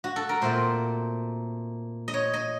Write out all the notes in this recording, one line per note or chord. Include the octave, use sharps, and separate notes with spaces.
F#4
A4
A#4
A#2 A3 C4 C5
D#5
C#5
D#5